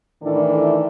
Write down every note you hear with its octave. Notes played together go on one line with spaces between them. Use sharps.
A2 D#3 E3 D4 A4